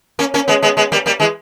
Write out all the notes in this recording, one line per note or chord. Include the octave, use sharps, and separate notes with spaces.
A#3 C#4
A#3 C#4
G#3 B3
G#3 B3
G#3 B3
G3 A#3
G3 A#3
E3 G#3